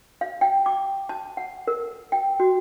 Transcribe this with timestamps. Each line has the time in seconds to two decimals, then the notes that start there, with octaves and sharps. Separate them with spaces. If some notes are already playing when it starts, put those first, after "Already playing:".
0.21 F5
0.41 G5
0.66 D6
1.09 A5
1.37 F#5
1.67 A#4
2.12 G5
2.40 F#4